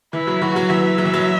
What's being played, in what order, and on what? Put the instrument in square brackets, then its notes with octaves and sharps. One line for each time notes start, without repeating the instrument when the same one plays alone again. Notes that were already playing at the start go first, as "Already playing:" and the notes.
[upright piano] E3 [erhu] E4
[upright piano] F#3
[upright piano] E3 [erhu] F#4
[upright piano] F#3
[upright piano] E3 [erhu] E5
[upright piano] F#3
E3
F#3